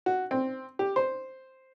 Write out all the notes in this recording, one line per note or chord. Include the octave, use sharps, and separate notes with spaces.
F#4
C4
G4
C5